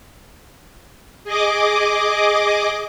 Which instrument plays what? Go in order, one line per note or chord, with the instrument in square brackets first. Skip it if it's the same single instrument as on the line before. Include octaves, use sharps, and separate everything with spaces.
[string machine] G#4 D#5 D6